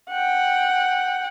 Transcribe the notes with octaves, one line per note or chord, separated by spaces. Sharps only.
F#5 G5